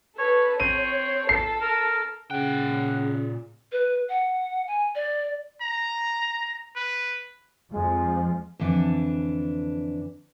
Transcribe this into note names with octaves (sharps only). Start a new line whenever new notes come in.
A4 B4 C#5
C4 C#5 D#7
A4 C7
A#4
A#2 C#3 F#5 G5
B4
F#5
G#5
D5
A#5
B4
F2 F3 G#3
F2 D3 E3 D4